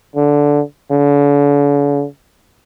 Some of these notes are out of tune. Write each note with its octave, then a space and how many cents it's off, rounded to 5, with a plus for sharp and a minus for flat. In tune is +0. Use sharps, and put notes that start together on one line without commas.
D3 -10
D3 -45